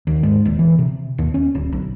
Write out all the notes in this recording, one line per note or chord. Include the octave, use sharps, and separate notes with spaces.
D#2
G#2
D#1
E3
C3
D#2
C#4
D1
B1